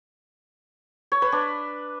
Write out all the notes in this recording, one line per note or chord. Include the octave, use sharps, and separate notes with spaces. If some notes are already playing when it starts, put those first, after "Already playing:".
C#5
B4
D4